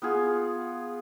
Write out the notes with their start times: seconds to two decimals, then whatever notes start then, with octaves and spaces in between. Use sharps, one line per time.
0.02 B3 F4 G#4